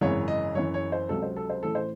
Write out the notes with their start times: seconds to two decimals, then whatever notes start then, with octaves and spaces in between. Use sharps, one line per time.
0.01 G#1 F#2 C#3 E3 C#5
0.28 D#5
0.55 F#1 F#2 E3 C#5
0.74 C#5
0.92 C5
1.09 C#2 C3 F#3 A4
1.22 C5
1.37 A4
1.50 C5
1.63 A1 A2 E3 A4
1.75 C5